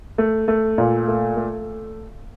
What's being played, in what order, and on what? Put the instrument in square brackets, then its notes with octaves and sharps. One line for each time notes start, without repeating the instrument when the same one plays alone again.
[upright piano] A3
A3
A#2
A3
A3